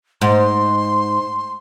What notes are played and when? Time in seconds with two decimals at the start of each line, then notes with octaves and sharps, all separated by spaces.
0.21 G#2 C6